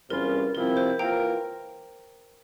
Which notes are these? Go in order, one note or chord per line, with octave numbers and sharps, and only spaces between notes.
E2 C3 G3 C#4 F4 A#4
C3 F3 C4 E4 A#4
C5
E3 A#3 F4 A#4 G5 A#5